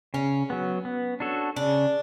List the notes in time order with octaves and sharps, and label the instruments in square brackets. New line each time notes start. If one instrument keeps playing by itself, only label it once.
[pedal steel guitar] C#3 [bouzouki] C#4
[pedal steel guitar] F#3 B3
B3
D4 F#4 A4 C#5
[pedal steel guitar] C#3 [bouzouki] D4